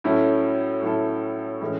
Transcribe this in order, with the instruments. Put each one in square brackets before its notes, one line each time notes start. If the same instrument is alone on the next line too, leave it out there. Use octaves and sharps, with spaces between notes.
[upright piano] A2 F#3 C#4 E4 A4
A2 F#3 C#4 E4 A4
A2 E3 G#3 C#4